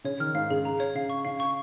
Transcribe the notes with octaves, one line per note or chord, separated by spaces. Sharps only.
C#3 C#5
D#3 F6
G#2 F5
C#3 G#4
A#5
C#5
C#3 F5
C#6
C#3 F5
C#6